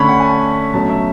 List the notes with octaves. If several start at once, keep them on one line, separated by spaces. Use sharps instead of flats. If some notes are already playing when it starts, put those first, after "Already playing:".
Already playing: D3 A3 C#4 B5 C#6
F#5
G#5
A5
B2 F#3 A3 C#4 A5
E5